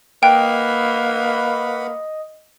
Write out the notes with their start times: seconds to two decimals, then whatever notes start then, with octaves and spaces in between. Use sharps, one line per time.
0.23 A#3 B4 D#5 F#5 G5 B5